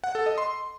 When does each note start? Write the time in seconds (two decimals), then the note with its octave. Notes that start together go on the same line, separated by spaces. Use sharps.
0.04 F#5
0.15 A4
0.26 D#5
0.38 C6